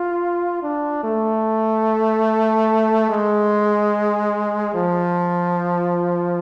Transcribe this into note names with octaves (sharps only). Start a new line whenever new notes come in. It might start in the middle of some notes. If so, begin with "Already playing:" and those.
Already playing: F4
D4
A3
G#3
F3